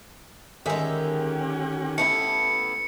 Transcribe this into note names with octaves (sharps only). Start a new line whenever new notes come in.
D3 D#3 G#3 C#4 G4 G#4 E5
A3 B3 E4 C#7